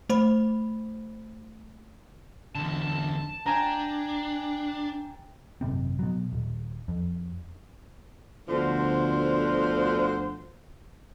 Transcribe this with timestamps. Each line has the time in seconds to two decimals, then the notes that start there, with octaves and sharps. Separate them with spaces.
0.10 A3 C5 B5
2.55 E2 D3 A5
3.46 D4 G5 G#5 A#5
5.61 G#1 F#2 C3 C4
5.99 B2 F#3
6.33 D#1
6.88 F2
8.49 D2 B2 D3 F3 D4 C5